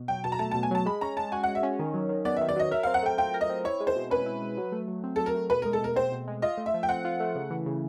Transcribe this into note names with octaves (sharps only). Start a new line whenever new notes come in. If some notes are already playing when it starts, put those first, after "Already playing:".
Already playing: B2
F#3 G5
B2 A5
A#5
A3 A5
A5
B2
G#5
F#3 A5
G#3 B5
C#4 A#5
G#3 A5
F#4 G#5
F#5
G#3
E5
C#4
D#3
F#3
D#3
B3 D5
E5
D#3
D5
F#3 D#5
A#4 E5
F5
C4
F#5
A3 G5
F4 G5
A#4
D#5
C4
E4 C#5
G#3
C5
B2
C#4 B4
E4
G#3
F#3
A3
F#3
C4
F#3 A4
A#4
A3
B2 B4
A#4
G#3
A4
B2 A#4
C4 C5
B2
G#3
F4 D#5
A3
E5
F3
G5
C4 F#5
F4
A3
C#3
E3
C#3